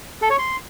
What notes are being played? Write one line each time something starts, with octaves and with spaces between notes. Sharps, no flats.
A4
C#5
C6